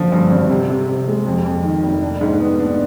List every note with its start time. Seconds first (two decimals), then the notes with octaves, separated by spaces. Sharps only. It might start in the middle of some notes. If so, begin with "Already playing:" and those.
Already playing: D3 F3
0.12 G2
0.30 G#1
0.49 C3
0.70 C3
0.88 C3
1.07 G#3
1.26 F2
1.45 F2
1.63 D#3
1.83 F1
2.02 D4
2.21 G#2
2.40 B3
2.59 D4